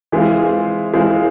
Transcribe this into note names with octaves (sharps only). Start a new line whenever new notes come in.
E3 G#3 C4 F4
E3 G#3 C4 F4